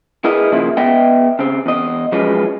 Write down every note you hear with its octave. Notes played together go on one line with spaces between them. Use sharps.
E4 G#4 A#4 B4 D#5
C#3 F3 A#3 E4
B3 D#5 E5 G5
C#3 C4
E2 D#5
F3 F#3 G#3 C#4 B4